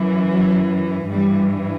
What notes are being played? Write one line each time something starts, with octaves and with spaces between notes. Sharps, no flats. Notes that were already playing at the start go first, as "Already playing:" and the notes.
Already playing: F#2 E3
F#3
G2 E3 G3